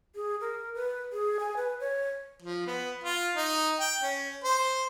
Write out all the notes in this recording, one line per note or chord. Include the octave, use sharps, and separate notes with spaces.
G#4
A#4
B4
G#4
G#5
B4
C#5
F3
B3
F4
D#4
G5
C#4
C5